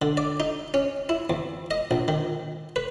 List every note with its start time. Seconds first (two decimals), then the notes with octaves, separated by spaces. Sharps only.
0.02 D3
0.17 D5
0.40 D#4
0.74 C#4
1.09 E4
1.30 E2
1.71 D#5
1.91 A#1
2.08 D#3
2.76 B4